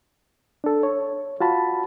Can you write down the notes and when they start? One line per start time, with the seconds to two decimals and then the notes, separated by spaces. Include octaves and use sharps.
0.64 D4 A4
0.83 C#5
1.40 F4 F#4 A5 B5